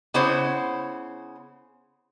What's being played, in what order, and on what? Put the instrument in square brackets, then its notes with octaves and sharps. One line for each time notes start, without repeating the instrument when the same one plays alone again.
[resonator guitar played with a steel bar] C#3 B3 E4 C5 C#5